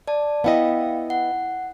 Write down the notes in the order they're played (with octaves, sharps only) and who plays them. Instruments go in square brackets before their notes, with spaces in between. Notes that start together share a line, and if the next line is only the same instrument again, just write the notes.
[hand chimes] D5 A5
[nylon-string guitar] B3 E4 D#5 [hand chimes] F5 G5
[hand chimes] F#5